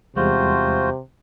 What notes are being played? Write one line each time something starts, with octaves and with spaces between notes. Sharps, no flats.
E2 C3 G3 G#3 F4 F#4 C5